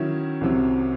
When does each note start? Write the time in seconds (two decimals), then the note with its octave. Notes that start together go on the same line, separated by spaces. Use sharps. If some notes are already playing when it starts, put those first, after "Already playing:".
Already playing: D#3 F#3 C#4 E4
0.41 C2 C3 F#3